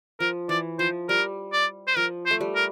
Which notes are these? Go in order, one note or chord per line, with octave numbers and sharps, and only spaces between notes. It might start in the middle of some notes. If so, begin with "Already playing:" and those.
F3 A#4
E3 D5
F3 C5
G3 A#4
D5
C5
F3 A#4
C5
A3
G3
A#4